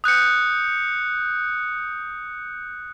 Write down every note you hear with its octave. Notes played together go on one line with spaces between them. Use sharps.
D#6 F#6 G6 C#7